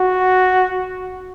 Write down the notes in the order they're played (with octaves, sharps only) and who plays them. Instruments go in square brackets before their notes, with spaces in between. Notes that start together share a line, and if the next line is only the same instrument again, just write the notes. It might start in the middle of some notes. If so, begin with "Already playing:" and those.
Already playing: [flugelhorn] F#4